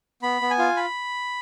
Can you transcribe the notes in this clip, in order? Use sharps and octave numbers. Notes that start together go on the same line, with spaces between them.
B3 B5
B3
G#5
F4
B5